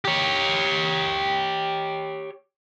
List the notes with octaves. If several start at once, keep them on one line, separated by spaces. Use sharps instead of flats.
G4 C#5